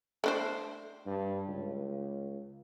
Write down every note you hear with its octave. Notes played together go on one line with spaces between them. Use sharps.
A3 D4 C5
G2
C#2